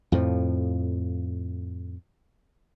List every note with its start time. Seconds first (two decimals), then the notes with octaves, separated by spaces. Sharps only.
0.12 F2 A2 F3